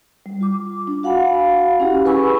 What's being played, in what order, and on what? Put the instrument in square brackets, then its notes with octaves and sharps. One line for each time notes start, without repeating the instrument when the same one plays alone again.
[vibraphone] G3
F4 D6
D4
F#4 F5 F#5 G#5 B5
C#4 E4 G4
G#4 B4 G#5 B5 C#6 E6